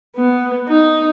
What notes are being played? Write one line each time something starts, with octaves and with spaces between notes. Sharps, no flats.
B3
D#4